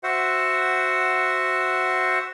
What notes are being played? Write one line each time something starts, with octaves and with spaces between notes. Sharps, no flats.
F#4 C5 E5 F#5